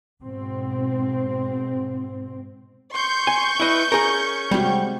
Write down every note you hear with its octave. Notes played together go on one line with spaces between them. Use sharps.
G#2 B2 C4
C6 C#6 G6
G#5
E4 B4 D#5
C#4 G#4 A#4
C3 G3 G#3 C4 F#4